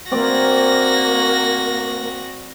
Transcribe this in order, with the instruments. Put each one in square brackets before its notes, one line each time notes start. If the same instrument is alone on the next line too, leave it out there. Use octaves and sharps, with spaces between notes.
[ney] A#3 [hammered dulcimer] C4 D5 [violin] F#4 A#6